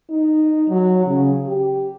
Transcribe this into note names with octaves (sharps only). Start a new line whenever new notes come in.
D#4
F#3
C#3
G4